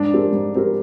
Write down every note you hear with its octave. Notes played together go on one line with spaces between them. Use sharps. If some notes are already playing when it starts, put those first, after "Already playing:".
Already playing: G#2 D4
G3 C4 G4 A#4
G#2
G3 C4 G4 A#4